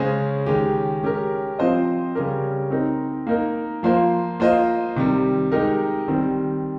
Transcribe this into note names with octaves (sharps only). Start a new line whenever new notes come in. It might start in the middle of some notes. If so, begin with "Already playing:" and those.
Already playing: C#3 G#3 C#4 G#4 C5
D#3 G#3 C#4 G4
G#3 C#4 G4 A#4
F3 C4 F4 C5 D#5
C#3 G3 C#4 G4 A#4
C4 D#4 A#4
A#3 D#4 A#4
F3 A#3 F4 C5
A#3 F4 C5 D#5
C3 D#3 G3
G#3 D#4 G4 A#4
D#3 G3 C4